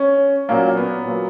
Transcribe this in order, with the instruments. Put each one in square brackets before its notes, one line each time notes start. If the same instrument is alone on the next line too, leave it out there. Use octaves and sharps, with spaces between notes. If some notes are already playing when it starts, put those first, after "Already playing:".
Already playing: [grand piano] C#4
A#2 F#3 A#3 C#4
B3
A#2 F#3 A#3